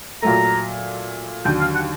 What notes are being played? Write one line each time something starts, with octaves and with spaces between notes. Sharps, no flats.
A#2 F#3 A3 A#5
D#2 D3 F#3 G5
F5
F#5